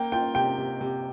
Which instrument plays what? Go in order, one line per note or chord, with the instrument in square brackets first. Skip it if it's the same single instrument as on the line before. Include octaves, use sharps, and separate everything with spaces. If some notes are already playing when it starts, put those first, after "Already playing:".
Already playing: [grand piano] A#3 [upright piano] G5
[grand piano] F4 [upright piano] G5
[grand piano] C3 [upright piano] G5
[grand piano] C3
C3